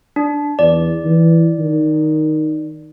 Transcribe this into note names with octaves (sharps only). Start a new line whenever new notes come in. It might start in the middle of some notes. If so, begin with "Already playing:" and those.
D4
E2 D5
E3
D#3